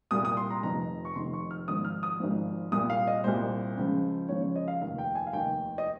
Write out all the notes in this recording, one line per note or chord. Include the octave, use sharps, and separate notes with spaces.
C2 A#2 G3 D#6
D#6
C6
A#5
F1 F2 D#3 A#5
C#6
F1 F2 D#3 C6
C#6
F6
G#1 G#2 F3 D#6
F6
D#6
G#1 G#2 F3
C2 A#2 G3 D#6
F5
D#5
C2 A#2 G3 C5
C#2 C#3 F3
C#2 C#3 F3 C#5
C#5
D#5
F5
F1 D#2 D#3 F5
G5
G#5
F5
F1 D#2 D#3 G5
D#5